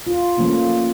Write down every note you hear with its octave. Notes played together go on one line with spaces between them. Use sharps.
F4
F3 A3 A#3 C#4